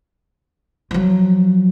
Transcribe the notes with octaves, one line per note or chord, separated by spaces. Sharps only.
F3 F#3